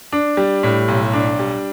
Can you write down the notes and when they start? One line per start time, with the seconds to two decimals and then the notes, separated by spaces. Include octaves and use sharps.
0.13 D4
0.37 G3
0.63 A2
0.88 B1
1.14 D4
1.39 G3